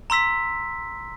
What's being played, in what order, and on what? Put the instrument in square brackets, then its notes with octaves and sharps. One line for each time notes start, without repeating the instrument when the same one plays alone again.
[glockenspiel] A#5 C6 E6 B6